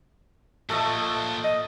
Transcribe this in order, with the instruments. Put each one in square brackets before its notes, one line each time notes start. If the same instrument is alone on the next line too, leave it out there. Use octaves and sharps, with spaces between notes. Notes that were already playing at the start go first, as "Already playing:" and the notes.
[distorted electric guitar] A#2 F3 [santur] A3 A4 D#5
[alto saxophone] D#5